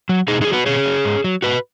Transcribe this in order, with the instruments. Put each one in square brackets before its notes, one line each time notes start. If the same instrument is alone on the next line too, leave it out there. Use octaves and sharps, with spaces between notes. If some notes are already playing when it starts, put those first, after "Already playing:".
[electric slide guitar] F#3
B2 D#4 G#4
D#4 G#4
F#3
F#4 B4
B2 G#4 C#5
F#3
G#2
F#3
G#2 F#4 B4